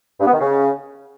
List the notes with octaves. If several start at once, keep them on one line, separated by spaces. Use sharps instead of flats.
G2
B3
D#3
C#3